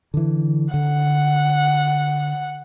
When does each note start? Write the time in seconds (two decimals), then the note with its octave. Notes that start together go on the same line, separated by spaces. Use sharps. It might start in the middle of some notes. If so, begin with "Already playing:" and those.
0.14 D3 E3
0.74 D3 F#5